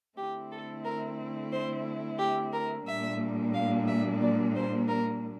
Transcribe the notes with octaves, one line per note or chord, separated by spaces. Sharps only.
D3 A3 C4 E4 G4
A4
A#4
C5
G4
A#4
A#2 G3 A#3 D4 E5
F5
E5
D5
C5
A#4